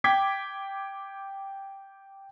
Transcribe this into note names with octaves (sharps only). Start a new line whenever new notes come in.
G5 D6 G#6 B6